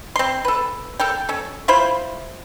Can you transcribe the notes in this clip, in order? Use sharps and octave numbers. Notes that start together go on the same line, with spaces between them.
C4 C6
A4 B4
A4 A#4 G5
C#4 A4
E4 F4 C5 B5